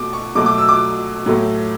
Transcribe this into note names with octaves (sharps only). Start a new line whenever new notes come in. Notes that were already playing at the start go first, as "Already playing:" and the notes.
Already playing: B2 A3 D6
C#6
B2 F#3 A3 D6
D6
E6
D6
A2 F#3 A3